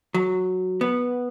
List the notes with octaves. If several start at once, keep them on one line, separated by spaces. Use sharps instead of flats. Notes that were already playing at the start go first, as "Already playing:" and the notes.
F#3
B3